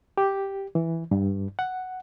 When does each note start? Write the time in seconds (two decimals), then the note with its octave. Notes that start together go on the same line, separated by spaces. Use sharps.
0.18 G4
0.75 E3
1.11 G2
1.59 F#5